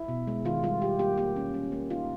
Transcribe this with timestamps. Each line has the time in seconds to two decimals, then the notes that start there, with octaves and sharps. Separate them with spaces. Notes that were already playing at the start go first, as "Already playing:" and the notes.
Already playing: E4
0.08 B2
0.27 G#3
0.45 D#3 F4
0.63 G3 F4
0.81 G3 G4
0.99 A#3 G4
1.18 A#3 G4
1.36 C#4
1.54 C#4
1.72 A#3
1.90 D#4 F4